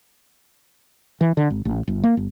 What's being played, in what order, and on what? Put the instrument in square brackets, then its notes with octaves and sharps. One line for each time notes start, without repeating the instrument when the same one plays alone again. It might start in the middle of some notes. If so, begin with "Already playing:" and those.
[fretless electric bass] E3
D3
G#1
A1
G1
A#3
G1